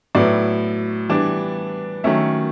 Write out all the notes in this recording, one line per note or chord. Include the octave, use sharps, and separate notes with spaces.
A2 F#3 B3 E4 D5
E3 G3 B3 D4
D#3 F#3 A3 C#4 E5